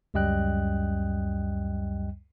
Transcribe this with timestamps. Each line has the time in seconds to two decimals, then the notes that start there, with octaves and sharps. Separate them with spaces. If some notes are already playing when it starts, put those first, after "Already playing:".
0.14 C#2 F#2 G3 D#5 G5 F#6